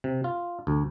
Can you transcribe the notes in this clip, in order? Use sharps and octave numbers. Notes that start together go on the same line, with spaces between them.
C3
F4
D2